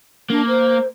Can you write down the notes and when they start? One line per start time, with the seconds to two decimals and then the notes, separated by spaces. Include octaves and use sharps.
0.30 A#3 D4
0.47 C5